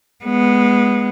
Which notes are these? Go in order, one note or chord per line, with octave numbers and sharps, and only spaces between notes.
G#3 B3